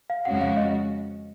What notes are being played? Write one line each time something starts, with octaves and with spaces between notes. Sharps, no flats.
F5
F2 C#3 G#3 C#4 F#4 F#5
F5
D#5